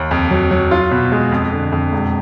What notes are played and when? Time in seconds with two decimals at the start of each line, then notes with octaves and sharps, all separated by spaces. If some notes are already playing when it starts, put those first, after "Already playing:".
Already playing: D#2
0.11 F2
0.31 F#3
0.51 F#3
0.71 F4
0.91 B2
1.12 G#3
1.32 F2
1.52 D3
1.72 F2
1.93 E1